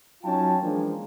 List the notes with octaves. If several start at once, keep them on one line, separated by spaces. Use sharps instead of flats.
F#3 C#4 D#4 F4 G5 A5
E3 F3 G#3 A#3 D4